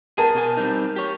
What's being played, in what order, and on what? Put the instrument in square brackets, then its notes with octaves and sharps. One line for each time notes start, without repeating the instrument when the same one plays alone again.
[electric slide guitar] B3 G#4 [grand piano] A#4 A5 D#7
[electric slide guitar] B2 A4 G#5
G3 C4 D#4
G4 C#5